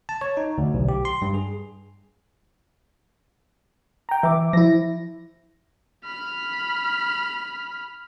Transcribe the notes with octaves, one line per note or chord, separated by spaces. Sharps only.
A5
C#5
D#4
D2
B1
G4
C6
G2
G#4
G5 A#5
E3 E5 D6
F3 E4 A#6
B5 F6